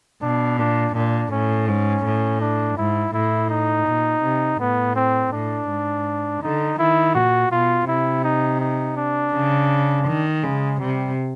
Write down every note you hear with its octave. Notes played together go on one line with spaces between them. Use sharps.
B2 D4
A#2 D4
A#2 D4
A2 C#4
G#2 C#4
A2
D4
G#2 E4
A2 E4
D#4
A#2
C3
A2 B3
C4
A2 D4
G#2
D3 D#4
D#3 E4
A#2 F#4
B2 F4
C3 E4
D#4
D#4
D4
C#3
D#3
C#3 G#3
C3 G3